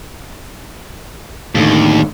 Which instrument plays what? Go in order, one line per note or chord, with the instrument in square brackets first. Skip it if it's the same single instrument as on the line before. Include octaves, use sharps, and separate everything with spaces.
[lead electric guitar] D#2 [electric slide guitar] A2 D3 D#3